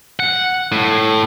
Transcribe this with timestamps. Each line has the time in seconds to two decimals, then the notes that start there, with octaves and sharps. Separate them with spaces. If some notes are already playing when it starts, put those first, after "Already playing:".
0.20 F#5
0.72 A2